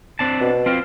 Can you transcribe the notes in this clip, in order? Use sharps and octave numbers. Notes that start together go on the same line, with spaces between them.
C4 D4 A5
B2
C4 F4